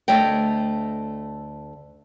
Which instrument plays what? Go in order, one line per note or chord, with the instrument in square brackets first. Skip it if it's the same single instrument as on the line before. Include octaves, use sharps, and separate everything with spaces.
[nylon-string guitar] D2 A3 C#5 D#5 G5